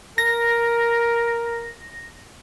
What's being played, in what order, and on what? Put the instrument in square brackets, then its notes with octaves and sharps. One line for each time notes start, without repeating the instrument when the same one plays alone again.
[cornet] A#4 [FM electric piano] A#6